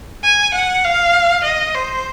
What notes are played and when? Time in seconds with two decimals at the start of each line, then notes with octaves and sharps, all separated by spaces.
0.24 G#5
0.54 F#5
0.84 F5
1.45 D#5
1.75 C5